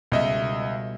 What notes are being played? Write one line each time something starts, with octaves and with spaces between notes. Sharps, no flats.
C#2 B2 G3 D#5 E5